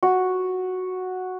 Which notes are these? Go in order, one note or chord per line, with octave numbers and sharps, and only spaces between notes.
F#4